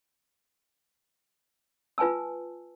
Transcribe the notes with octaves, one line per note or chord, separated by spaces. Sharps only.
F4 B4 G#5 A5 E6